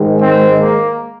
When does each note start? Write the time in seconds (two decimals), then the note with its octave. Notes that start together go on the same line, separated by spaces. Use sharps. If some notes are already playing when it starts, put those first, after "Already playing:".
Already playing: G#2 D#3 G#3
0.20 C4
0.60 A#3